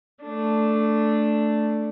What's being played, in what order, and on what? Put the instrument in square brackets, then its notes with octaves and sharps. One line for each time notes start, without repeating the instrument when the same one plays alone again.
[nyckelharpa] A3 D4